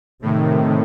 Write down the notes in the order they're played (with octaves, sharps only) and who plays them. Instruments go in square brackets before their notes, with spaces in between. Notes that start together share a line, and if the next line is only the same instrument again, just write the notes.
[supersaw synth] A2 [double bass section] C3 D#3 A3